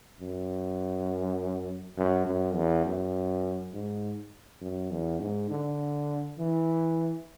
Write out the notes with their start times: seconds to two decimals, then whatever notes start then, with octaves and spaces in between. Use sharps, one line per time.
0.20 F#2
1.97 F#2
2.26 F#2
2.55 E2
2.85 F#2
3.73 G#2
4.62 F#2
4.91 E2
5.20 G#2
5.50 D3
6.38 E3